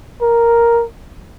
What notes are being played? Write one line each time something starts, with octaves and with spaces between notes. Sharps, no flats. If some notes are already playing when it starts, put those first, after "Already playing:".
A#4